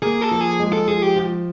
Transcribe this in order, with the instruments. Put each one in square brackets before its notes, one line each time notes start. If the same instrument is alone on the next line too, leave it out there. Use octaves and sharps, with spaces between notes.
[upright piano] A#3 [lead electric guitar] G#4
[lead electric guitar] A4
[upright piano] F3
[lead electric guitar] G#4
[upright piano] G#3
[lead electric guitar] A4
[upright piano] F3 [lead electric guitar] G#4
[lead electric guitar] G4
[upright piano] F3